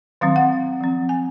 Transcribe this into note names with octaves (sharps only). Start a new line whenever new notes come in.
D#3 F#3 C4 F5
F#5
F3 C4
G#5